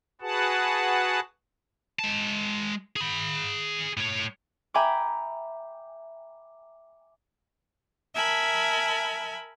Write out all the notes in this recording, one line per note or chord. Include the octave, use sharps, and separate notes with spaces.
F#4 G#4 B4 F#5 A5
G#3 A5
G#4 B5
A2 C#5
E5 G5 G#5 A#5 B5 D6
A#4 E5 G#5 A5 B5